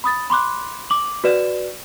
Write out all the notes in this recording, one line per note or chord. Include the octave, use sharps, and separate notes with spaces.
B5 D#6 A6
B5 C6 D6 F#6
D6 F#7
F#4 B4 D5 E7